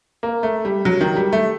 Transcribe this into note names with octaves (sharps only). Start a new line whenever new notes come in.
A#3
A3
G3
F#3
D#3
G3
A3